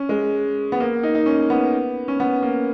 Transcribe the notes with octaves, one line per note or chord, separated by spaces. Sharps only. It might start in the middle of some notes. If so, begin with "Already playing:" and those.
Already playing: C#4
G#3
B3
A#3
D#4
D#4
C#4
B3
C#4
B3
A#3